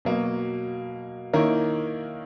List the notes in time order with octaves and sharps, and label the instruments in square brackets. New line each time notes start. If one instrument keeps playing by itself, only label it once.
[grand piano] B2 F#3 A#3
D#3 A#3 E4 A#4 C#5